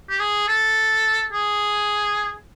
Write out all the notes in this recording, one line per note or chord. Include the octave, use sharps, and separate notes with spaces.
G4
G#4
A4
G#4